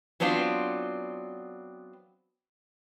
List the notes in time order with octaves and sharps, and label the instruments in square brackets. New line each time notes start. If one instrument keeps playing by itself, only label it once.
[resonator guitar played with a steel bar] F#3 B3 C4 D4 F4